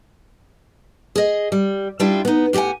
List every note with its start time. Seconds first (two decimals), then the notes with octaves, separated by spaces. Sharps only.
1.16 G#4 D#5
1.52 G3
2.00 G3 D4 E4 F4 E5 G5
2.25 B3 D#4
2.53 A2 G4 D#5 F#5 G#5